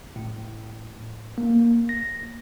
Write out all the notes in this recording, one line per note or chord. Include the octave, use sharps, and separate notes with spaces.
A2
A#3
A#6